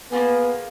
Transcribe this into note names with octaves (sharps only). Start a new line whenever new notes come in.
A#3 B3 C#4 F4 G#4